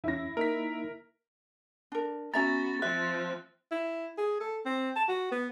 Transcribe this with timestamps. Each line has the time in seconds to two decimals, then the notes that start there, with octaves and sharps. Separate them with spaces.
0.04 E2 C#4 E4 A#6
0.37 A#3 D#4 A#4 B6
1.92 D4 A#4
2.34 B3 C#4 F#4 E5 A#5 A6
2.82 F3 C4 E5 F#6
3.71 E4
4.18 G#4
4.40 A4
4.66 C4
4.96 A5
5.09 F#4
5.32 B3